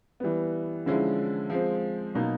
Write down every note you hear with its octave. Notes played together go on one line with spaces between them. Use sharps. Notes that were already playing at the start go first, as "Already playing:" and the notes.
E3 G3 B3
D3 F3 G#3 C#4 E4
F3 G#3 C4
B2 F#3 A#3 D#4